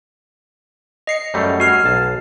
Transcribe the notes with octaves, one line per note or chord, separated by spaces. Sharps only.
D#5 C7 C#7
F#2 G3 A3
F#4 F6 C7
B1 A5